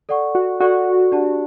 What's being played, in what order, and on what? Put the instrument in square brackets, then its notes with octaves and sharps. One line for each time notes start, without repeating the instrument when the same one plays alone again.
[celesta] A4 D5 F#5 C#6
[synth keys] F#4
[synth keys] F#4 [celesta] A4 D5 F#5 C#6
[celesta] D4 G4 D5 A5